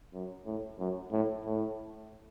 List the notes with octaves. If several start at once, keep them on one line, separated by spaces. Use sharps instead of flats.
F#2
A2
F#2
A2
A2